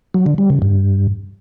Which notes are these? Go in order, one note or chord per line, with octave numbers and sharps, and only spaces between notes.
F#3
D3
G3
C#3
G2